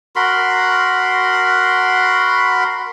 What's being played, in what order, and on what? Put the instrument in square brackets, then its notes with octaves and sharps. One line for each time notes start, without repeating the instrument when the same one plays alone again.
[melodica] F#4 A#4 B5 C6